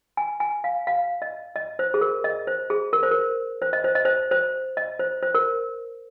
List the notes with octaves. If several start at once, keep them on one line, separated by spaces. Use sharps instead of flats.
G#5
G#5
F5
F5
D#5
D#5
C5
G#4
A#4
D#5
C5
G#4
A#4
C5
A#4
C5
D#5
C5
D#5
C5
C5
D#5
C5
C5
A#4